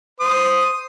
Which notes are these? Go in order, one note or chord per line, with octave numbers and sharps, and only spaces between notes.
C5 D#6